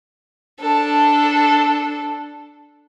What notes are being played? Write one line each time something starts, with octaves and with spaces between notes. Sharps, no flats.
D4 A4